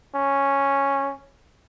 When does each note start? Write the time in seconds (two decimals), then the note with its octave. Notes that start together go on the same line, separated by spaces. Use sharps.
0.15 C#4